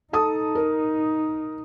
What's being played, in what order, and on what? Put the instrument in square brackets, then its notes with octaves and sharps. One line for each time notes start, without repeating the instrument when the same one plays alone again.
[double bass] D#4 [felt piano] A4 A5 D#6
[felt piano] A#4